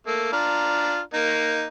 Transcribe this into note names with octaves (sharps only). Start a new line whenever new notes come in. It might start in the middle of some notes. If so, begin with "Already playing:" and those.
A3 A#3
D4 F4 A#5
A#3 D#4